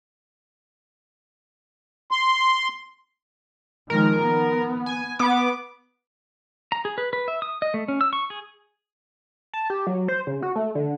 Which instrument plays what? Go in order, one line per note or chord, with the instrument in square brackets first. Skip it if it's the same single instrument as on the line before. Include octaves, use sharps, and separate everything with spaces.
[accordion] C6
[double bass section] D#3 F3 G#3 [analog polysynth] A#4
[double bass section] B3
[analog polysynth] G#5
B3 D6
[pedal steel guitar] A#5
G#4
B4
B4
E5
D#6
D#5
A3
C#4
E6
C#6
G#4
[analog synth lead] A5
G4
F#3
C5
C#3
F#4
A3
D3